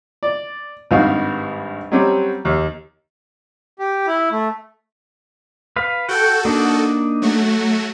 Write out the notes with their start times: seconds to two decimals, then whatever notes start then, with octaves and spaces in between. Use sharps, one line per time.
0.23 D5
0.91 G#1 G2 D#4 F#4 F5
1.92 F#3 G3 C4 C#4 G4
2.45 D#2
3.79 G4
4.07 E4
4.31 A3
5.76 B4 F5
6.09 F#4 A4 F#5 G5
6.45 A#3 D4 D#4
7.22 F#3 A3 F#4